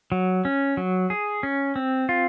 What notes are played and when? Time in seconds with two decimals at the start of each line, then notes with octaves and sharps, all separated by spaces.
0.12 F#3
0.45 C#4
0.77 F#3
1.10 G#4
1.43 C#4
1.76 C4
2.09 F4